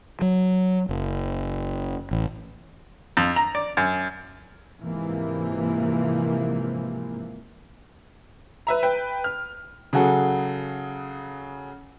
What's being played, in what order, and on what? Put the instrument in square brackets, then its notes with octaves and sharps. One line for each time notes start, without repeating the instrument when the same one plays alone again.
[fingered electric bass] F#3
F#1
A1
[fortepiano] F2
A#5
D5
F#2
[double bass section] G#2 C3 E3 F3 A#3
[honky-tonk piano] B4 E5 A#5
B4 G5
F6
[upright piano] C#3 F#3 F#4 G#4 A4